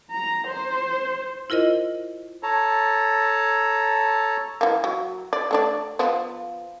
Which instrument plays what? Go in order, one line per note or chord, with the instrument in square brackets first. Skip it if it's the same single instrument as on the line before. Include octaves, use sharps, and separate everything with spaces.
[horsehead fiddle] A#5
C5
[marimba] E4 F4 A#4 C5 D#5
[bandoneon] A4 C#5 A5 A#5
[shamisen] E3 A#3
F#3
D5
A3 D4 D5
F3 B3 C5